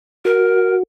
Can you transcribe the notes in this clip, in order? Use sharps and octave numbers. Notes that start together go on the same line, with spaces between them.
F#4 A#4